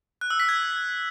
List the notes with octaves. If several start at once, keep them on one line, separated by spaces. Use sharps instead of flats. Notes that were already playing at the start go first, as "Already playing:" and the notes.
F#6
E6
B6
G#6